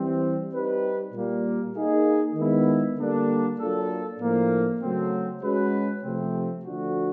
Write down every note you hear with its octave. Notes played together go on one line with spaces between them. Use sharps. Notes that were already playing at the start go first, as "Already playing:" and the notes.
Already playing: E3 G3 C4
G3 C4 D#4 G4 B4
A#2 G3 A#3
A#3 D#4 G#4
D#3 G#3 B3 E4
D3 G3 A#3 D4
F#3 A#3 D4 F4 A4
A2 F3 A#3 D4
C#3 F#3 A3 C4
G#3 C#4 F#4 B4
C3 F3 A3 C4
D3 F3 A3 D4 F#4